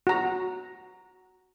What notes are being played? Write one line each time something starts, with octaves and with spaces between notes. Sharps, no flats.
F#4 A#5